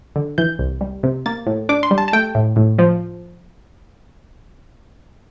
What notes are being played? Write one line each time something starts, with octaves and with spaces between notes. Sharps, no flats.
D3
E3 G6
C2
G3
C3
A#3 A6
A2
D4 D6
C6
G3
A5
A5
A3 G5
A2
A2
F3